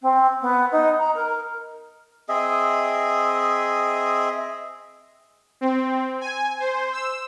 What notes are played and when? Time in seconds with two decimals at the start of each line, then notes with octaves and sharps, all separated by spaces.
0.01 C4
0.41 B3
0.71 D#4
0.98 A#5
1.15 A#4
2.29 C4 G#4 D#5 E5
5.61 C4
6.21 G#5
6.60 C5
6.93 E6